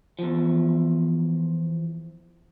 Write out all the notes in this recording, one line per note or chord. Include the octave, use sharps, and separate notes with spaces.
E2 F3